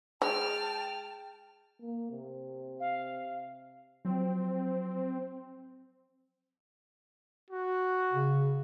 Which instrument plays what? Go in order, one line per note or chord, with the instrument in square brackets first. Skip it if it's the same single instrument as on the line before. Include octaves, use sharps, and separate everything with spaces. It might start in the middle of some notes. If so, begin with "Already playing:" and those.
[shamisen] G#3 [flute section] G5 A5 [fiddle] F6
[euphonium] A#3
C3
[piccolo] F5
[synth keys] F3 F#3 [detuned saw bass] C4
[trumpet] F#4
[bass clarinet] C#3